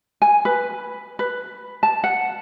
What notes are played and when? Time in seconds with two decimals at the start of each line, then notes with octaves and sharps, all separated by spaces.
0.22 G#5
0.45 B4
1.19 B4
1.83 A5
2.04 F#5